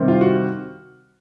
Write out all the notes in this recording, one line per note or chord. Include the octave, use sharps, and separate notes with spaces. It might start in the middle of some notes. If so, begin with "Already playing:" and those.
Already playing: C3 D#3 G3 C4
F4
F#4